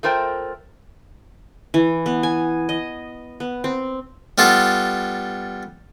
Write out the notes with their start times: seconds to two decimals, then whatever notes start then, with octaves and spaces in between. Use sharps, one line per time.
0.03 A3 F4 A#4 C5 G5
1.74 E3
2.06 B3
2.23 G#5
2.69 D#5
3.40 B3
3.64 C4
4.38 G3 B3 F4 A4